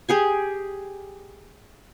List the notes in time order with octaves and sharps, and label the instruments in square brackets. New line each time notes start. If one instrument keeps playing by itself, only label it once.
[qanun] G4 G#4 G#5